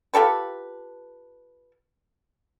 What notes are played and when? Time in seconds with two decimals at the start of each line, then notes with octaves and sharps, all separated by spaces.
0.14 F4 G4 A4 B4